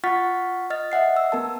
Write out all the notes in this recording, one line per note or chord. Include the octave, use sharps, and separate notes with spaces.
F4 F#5 C#6 F6 A6 B6
D#5 F6 A6
D#5 E5 F#5 C7
E6
B3 A#4 A5